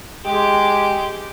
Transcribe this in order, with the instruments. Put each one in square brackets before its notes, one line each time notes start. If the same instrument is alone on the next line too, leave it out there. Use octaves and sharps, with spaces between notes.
[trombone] G#3 [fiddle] G4